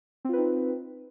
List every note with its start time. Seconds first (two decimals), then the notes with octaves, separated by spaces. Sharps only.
0.25 C4
0.29 F4
0.33 B4
0.37 D#4